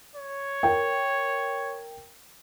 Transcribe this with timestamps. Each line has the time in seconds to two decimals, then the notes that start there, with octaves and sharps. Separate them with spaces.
0.16 C#5
0.63 A#4 G5